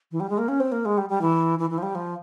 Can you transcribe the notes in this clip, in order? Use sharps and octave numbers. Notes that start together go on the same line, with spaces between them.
E3
G3
G#3
A#3
C#4
C4
A#3
G#3
G3
G3
E3
E3
E3
F3
G3
F3